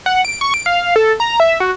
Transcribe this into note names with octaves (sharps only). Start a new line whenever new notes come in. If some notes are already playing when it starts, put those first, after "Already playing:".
F#5
D7
C#6
D7
F5
A4
A#5
E5
F#4